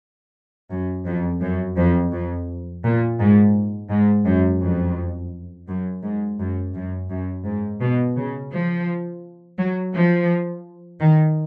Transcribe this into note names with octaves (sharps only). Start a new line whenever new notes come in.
F#2
F2
F#2
F2
F2
A#2
G#2
G#2
F#2
F2
F#2
G#2
F#2
F#2
F#2
G#2
B2
C#3
F3
F#3
F3
D#3